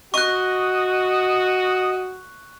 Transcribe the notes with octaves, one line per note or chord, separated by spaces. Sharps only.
F#4 D#5 C#6 F#6